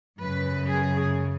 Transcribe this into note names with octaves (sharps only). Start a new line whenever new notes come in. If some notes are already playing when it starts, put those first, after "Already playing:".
F#2 C#3 B4
G#4